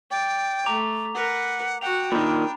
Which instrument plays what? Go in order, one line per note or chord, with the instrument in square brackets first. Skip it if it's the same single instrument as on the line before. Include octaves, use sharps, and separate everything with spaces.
[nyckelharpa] D5 [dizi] G5
[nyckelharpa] A3 [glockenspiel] A#5 D6 F7
[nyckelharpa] A#4 B4 [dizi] F#5
[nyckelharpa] F#4 F#5 [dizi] G5 [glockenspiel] F7
[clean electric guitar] A#2 D#3 [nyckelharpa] D4 [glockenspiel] A#5 B5